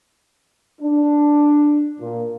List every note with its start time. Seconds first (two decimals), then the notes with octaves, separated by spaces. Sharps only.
0.81 D4
1.99 A#2